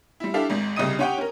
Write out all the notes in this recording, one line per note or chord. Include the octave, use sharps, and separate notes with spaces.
G3 E4
D4 E4 G4 A4 E5 F5
G#1 G#2
C2 C#3 G4 D#5 D#6 D#7
C#4 G4 C#5 F#5 G5
C#4 A#4